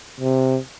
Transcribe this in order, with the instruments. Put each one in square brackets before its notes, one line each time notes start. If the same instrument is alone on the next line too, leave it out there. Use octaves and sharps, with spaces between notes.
[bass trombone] C3